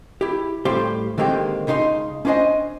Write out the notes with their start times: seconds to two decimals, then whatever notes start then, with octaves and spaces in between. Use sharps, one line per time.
0.21 E4 G4
0.65 A2 G3 G4 C5 F5 C6
1.18 D3 D#3 G#3 A#3 C4 G4
1.67 C#2 C#3 D#4 C5 C6
2.25 C#4 D4 B4 C5 D#5 G#5